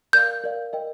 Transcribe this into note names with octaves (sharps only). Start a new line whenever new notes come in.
A#4 D5 F5 G6
A#4 D5 F5
A#4 D#5 G5